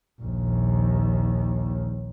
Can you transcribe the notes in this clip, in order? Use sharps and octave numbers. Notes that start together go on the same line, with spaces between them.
A#1 D#2